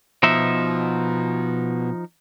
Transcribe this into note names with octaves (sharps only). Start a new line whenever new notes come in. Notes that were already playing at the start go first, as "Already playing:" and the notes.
B2 F3 D#4 E5